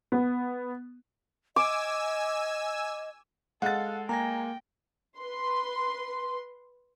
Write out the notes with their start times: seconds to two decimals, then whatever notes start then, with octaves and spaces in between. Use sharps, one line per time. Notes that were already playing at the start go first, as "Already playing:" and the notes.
0.12 B3
1.56 D#5 G#5 D6 E6
3.62 G#3 A4 F5 F#5 A6
4.09 A#3 G5 G#5 A#5 A#6
5.19 B4 C6